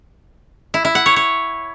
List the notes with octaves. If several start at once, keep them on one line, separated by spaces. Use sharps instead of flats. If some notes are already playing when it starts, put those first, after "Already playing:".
E4
E4
F#5
C#5
C#5